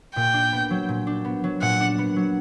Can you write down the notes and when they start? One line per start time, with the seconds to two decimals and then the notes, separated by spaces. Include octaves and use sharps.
0.15 A#2 G5
0.34 D4
0.52 B3
0.70 F#3
0.89 A#2
1.07 D4
1.25 B3
1.44 F#3
1.62 A#2 F#5
1.80 D4
1.98 B3
2.16 F#3